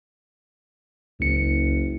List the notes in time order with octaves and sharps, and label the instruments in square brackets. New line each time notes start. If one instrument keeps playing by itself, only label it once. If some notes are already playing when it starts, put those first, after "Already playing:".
[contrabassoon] F#1 [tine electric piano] C#2 C#7